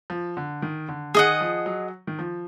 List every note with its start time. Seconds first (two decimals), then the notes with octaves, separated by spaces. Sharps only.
0.10 F3
0.37 D3
0.62 D#3
0.88 D3
1.14 D#3 G#4 D#5 F#5
1.41 F3
1.66 F#3
2.07 D#3
2.19 F3